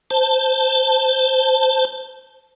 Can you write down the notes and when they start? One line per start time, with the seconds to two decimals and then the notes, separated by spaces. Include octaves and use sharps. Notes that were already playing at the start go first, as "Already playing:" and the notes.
0.10 C5 A5